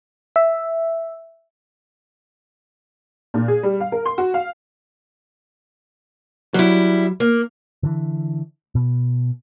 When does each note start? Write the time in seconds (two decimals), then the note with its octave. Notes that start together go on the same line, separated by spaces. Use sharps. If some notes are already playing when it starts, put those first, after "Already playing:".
0.36 E5
3.34 A#2
3.48 G#4
3.63 G3
3.80 F5
3.92 A#4
4.06 C6
4.18 F#4
4.34 F5
6.54 F#3 G3 E4
7.20 A#3
7.83 D3 E3
8.75 B2